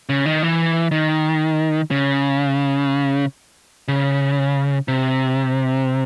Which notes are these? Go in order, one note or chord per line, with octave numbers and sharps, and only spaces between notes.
C#3
D#3
E3
D#3
C#3
C#3
C3